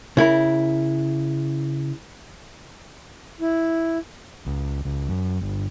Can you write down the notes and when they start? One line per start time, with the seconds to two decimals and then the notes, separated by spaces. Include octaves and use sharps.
0.17 C#3 E4 A#4
3.41 E4
4.46 C#2
4.85 C#2
5.09 F#2
5.41 G1